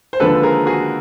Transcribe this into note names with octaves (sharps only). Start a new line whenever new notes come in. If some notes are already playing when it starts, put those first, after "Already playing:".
C5
D#2 D3 F3 G#3 A4 B4
G#4 A#4
F#4 G#4